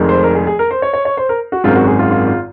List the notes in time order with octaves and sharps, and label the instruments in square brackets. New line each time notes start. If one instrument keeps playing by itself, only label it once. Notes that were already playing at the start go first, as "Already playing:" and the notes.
Already playing: [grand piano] F1 F2 D#3 G#3
C5
A#4
G#4
G#4
A#4
C5
C#5
C#5
C#5
C5
A#4
F#4
G#1 F#2 D#3 G#3 C4 F4
F#4
G#4
F4
F4
F4